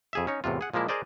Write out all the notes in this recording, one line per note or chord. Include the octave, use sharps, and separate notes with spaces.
F2 G#4 E5
C#4 D#4 C#5
E2 A2 C3 F4
G#4 F#5
A#2 F3 G#3 A#3 E4
G#4 A#4 C5 D5 D#5